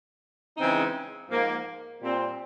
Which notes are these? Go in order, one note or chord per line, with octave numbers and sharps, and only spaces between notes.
C#3 E3 G#3 C4 D#4
G#2 F3 A#3
A#2 G3 C4